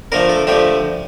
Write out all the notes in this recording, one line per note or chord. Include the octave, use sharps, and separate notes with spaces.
D3 F3 A3 A#4
A4
D3 F3 A3 G4